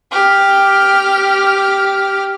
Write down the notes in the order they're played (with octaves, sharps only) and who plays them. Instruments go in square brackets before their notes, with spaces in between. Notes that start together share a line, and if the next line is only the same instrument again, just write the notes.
[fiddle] G4 F6